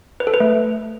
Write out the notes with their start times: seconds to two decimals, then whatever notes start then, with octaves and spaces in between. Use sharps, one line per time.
0.20 B4
0.27 A4
0.34 B4
0.40 A3